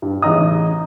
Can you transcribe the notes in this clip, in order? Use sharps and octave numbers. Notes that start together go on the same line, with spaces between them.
G2
A1 C#3 D#4 D#5 A#5 D#6